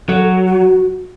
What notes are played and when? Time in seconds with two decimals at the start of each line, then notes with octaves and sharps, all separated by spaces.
0.09 F#3 A4
0.47 F#4